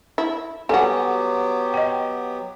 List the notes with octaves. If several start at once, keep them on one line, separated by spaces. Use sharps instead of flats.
E4
F#3 G3 B3 F#4 G4 A4 G#5
D#5 G5